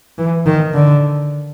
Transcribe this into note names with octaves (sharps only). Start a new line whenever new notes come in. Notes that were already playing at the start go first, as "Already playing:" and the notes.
E3
D#3
D3